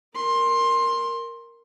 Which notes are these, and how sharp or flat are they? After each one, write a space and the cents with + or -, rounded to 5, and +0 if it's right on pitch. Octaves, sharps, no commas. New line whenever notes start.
A#4 +0 C6 +15